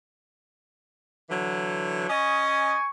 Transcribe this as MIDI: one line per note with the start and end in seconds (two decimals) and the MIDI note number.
1.29 2.08 50
1.29 2.08 52
1.29 2.08 54
2.09 2.73 61
2.09 2.73 75
2.09 2.89 80
2.09 2.89 85